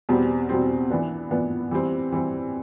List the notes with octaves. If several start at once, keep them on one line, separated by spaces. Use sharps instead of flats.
E2 B2 G3 C4
E2 B2 G3 C4
E3 B3 D4
E3 B3 D4
E3 G3 C4
E3 G3 C4